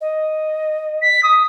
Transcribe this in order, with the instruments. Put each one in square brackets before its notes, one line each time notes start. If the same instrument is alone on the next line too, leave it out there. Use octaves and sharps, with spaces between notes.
[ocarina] D#5
[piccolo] B6
D#6